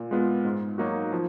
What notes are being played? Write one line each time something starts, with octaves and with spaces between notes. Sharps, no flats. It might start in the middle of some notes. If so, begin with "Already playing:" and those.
Already playing: A#2
G#3 B3 F4
G#2
F#3 A#3 D#4 F#4
F3